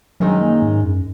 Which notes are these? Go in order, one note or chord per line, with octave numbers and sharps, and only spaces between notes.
F#2 D#3 F#3 G#3 D#4
A#3
G#2
F#2